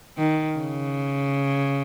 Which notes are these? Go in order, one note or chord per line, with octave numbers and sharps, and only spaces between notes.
D#3
C#3